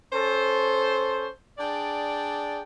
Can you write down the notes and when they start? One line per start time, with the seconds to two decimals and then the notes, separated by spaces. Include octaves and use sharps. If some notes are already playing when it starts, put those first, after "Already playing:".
0.13 C#4 A4 C5
1.59 D4 G#4 D5 G5